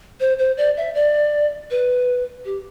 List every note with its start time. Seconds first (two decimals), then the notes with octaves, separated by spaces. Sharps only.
0.20 C5
0.39 C5
0.57 D5
0.77 E5
0.95 D5
1.71 B4
2.45 G4